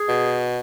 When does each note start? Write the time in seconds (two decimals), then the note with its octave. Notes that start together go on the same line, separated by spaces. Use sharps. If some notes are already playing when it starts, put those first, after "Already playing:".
Already playing: G#4
0.09 B2